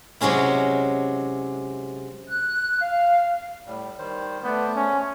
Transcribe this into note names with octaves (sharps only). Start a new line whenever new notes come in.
C3 F#3 G#3 C#4 E4
F#6
F5
A2 G3
D#3 G3 C5
A3 B3 C5 D5 G6
G#3 C#4